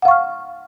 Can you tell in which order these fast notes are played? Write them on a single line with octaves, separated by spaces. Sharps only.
F#5 F5 C#6 F6